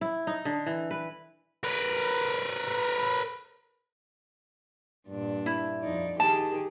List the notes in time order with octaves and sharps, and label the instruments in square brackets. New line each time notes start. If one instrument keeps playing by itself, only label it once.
[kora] E4
D#4
D3
E3
B4
[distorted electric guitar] A#4 B4
[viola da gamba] G2 A#2 D4
[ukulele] E4
[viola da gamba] F2 D#4 D5
[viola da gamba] D#3 G4 G#4 [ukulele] A5